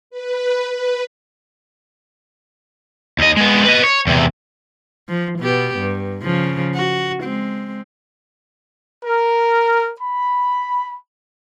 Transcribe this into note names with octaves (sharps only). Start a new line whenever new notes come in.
B4
B4
D#2 D#5
G#3 B3
B4 D#5
C#5
E2 C3
F3
B2 B3 G4
G2
C#3 F3
F#4
G#3 C4
A#4
B5